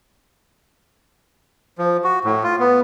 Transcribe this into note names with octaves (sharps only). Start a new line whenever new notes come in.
F3
F#4
A2
F4
B3